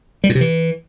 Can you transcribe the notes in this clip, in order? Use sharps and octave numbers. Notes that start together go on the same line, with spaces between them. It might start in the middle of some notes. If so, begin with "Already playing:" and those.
G3
A#2
C3
E3